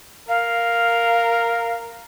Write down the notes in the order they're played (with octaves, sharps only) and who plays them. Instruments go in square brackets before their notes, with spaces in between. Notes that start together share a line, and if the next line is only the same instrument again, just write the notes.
[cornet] A#4 [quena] F5